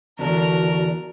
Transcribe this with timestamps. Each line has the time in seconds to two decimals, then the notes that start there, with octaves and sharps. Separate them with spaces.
0.19 E2 D3 D4 F#4 A#4